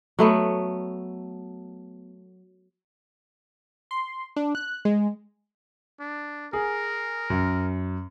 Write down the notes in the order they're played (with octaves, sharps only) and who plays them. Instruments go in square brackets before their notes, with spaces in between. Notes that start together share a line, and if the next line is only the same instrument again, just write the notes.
[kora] F#3 A3 B3
[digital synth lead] C6
D4
F#6
G#3
[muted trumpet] D4
[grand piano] G#4 [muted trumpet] A#4
[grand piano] F#2